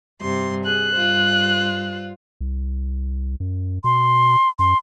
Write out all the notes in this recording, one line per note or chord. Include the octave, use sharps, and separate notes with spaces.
G2 C3 C6
G#4 F#6
G2 F4 C5
C2
F#2
B2 C6
F#2 C6